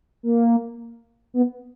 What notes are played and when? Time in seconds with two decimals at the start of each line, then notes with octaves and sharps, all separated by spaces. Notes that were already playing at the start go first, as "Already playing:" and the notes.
0.23 A#3
1.34 B3